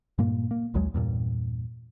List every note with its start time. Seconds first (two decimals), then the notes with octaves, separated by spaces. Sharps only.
0.18 G2 A#2 A#3
0.51 A#3
0.74 A#1 D#2 F#3 G#3
0.94 E2 G2 A#2